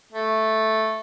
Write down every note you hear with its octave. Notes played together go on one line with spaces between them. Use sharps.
A3